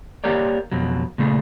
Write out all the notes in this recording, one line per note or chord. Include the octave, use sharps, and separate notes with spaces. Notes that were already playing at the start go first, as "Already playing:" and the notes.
A#3 G4 A#4 C#5 D5
F2 B2 F#3
A#2 C#3 A3 G#4